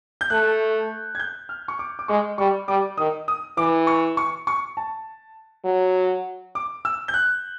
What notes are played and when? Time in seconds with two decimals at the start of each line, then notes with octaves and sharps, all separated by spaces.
0.21 G6
0.30 A3 F#6
1.15 G#6
1.20 G6
1.49 F6
1.68 C#6
1.79 D6
1.99 D6
2.08 G#3 C#6
2.38 G3 C#6
2.68 G3 D6
2.98 D#3 D#6
3.28 D#6
3.57 E3 D6
3.87 C#6
4.17 C#6
4.47 C#6
4.77 A5
5.65 F#3
6.55 D6
6.85 E6
7.08 G6
7.14 F#6